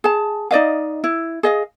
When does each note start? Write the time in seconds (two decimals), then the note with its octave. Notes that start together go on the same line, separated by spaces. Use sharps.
0.04 G#4 A5
0.51 D#4 D5 D#5 F5
1.04 E4
1.43 G#4 D#5 F5